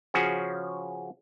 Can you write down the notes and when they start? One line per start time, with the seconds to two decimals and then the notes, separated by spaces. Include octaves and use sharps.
0.14 C#3 F3 C#4 F#4 G#4